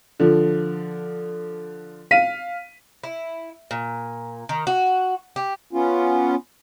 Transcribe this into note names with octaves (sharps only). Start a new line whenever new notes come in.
D3 F3
F5 B6 D#7
E4
A#2
D#3
F#4
G4
B3 C#4 F4